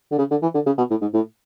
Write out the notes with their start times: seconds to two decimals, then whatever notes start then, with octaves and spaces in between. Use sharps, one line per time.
0.11 D3
0.18 C#3
0.31 D3
0.42 E3
0.54 D3
0.66 C#3
0.77 B2
0.90 A2
1.01 G#2
1.13 A2